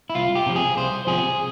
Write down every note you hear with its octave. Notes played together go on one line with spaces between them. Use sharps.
E4
C2 F4
G4
C3 F3
G#4
C2 C5
C3 F3 G#4